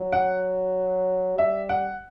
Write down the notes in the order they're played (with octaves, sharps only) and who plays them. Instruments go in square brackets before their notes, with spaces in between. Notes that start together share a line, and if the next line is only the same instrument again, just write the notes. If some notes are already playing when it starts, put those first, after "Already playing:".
Already playing: [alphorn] F#3
[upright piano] F#5
[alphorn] G3 [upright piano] E5
[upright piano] F#5